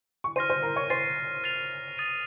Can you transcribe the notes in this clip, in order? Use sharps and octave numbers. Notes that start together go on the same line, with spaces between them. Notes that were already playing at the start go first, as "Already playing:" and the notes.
C#6
C5 C6 F6 A#6 D#7
C5 C6
A#4 A#5
C#5 C#6
C5 C6 A6 C7 D#7
F6 A6 C7 F7
D#6 A6 D#7